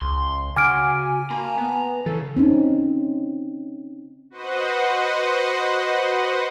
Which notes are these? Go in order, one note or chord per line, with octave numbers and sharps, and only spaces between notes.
C#2 C6
C#3 F#4 G#5 D6 F6 D7
A#3 A#5 B5
B3
C#3 E3 A4
C4 C#4 D#4
F#4 B4 C5 D#5 F#5